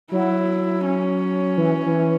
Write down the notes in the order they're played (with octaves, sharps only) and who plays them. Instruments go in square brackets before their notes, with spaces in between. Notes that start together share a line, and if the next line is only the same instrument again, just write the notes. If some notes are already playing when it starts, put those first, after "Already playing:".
[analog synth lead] F#3 [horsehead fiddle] E4
[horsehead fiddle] C#4
[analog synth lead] E3
E3